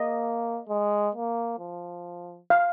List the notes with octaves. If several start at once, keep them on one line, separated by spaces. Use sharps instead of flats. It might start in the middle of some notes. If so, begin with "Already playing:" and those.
Already playing: A#3 D#5
G#3
A#3
F3
F5